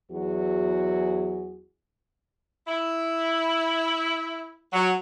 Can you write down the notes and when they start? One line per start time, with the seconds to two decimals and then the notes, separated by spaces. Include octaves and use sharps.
0.11 E2 F#3 E4 F#4 G#4
2.67 E4
4.72 F#3